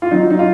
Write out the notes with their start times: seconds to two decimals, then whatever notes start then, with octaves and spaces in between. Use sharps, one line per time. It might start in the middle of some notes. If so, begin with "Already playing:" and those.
0.02 F4
0.11 F#3 D#4
0.30 D#4
0.39 F4